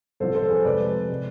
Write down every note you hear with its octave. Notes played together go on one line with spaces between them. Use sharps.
C2 C3 F3 A4 C5
A4 C5
G#4 B4
F2 C3 G#3 B4 D5
C3 G#3